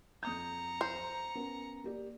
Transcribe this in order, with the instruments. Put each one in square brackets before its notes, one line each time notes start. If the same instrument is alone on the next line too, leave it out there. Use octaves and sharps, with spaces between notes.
[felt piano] F2 D#6 G6 [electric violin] A#5 C#7
[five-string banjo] C5
[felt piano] B3 C#4 A#4
A#3 G4 D5